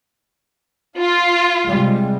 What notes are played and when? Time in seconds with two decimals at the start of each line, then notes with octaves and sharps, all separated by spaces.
0.99 F4
1.68 C3 G3 G#3